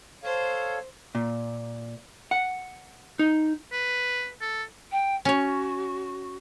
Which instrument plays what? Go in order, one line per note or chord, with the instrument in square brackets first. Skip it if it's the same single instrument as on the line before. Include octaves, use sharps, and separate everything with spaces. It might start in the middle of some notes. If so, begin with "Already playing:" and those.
[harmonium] A4 C#5 F5 [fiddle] C5
[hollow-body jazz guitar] A#2
F#5
D#4
[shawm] B4
A4
[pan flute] G5
[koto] C#4 C#5 [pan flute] F#4